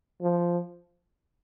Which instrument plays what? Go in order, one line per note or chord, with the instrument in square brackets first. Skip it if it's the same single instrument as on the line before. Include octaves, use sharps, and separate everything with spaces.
[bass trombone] F3